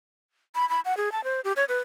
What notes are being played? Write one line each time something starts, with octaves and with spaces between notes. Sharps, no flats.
B5
B5
F#5
G#4
A5
C5
G4
C#5
B4